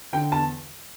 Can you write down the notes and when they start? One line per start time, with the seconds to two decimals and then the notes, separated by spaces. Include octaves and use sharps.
0.13 D3 G5
0.32 E2 A5